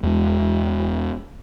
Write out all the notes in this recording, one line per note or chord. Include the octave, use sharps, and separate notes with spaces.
E2 G#3